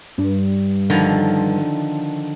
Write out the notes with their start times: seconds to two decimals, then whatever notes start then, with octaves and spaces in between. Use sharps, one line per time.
0.18 G2
0.90 D3 D#3 F3